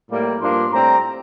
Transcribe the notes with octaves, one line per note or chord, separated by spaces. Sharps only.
A2 G3 A#3
G2 F3 A#3 D4 C6
A2 G3 C4 A#5